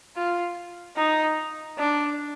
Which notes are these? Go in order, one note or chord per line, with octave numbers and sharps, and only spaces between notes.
F4
D#4
D4